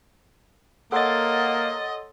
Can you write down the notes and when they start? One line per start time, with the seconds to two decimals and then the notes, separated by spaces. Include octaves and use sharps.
0.92 A#3 A4 C#5 D#5 F#5 C6 A6